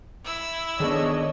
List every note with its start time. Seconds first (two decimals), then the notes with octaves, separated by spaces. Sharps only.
0.24 E4 E6
0.80 D#3 G#3 B3 D4 A4 C#5 D#5